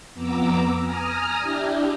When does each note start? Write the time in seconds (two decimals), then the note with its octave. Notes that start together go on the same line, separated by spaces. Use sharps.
0.14 F2 B3 A#5 D6 E6
0.83 G#5 A#5 D#6 F6
1.37 D4 E4 G4